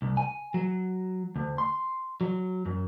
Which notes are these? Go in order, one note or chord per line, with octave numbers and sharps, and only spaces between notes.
C2
G#5
F#3
D2
C6
F#3
F#2